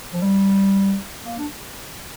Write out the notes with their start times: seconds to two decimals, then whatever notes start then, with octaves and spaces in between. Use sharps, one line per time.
0.13 F3
0.21 G3
1.25 A#3
1.38 D4